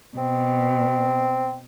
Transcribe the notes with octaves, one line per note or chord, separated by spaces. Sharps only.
B2 C4